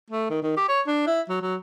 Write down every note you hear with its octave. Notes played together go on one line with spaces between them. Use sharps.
A3
D#3
D#3
G4
C#5
D4
E4
F#3
F#3